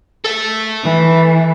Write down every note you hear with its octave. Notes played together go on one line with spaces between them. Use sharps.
A4 E5
E3